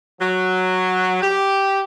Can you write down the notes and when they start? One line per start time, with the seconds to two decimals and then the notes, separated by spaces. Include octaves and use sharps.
0.20 F#3
1.22 G4